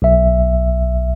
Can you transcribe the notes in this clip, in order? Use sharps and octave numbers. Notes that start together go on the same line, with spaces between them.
B1 E5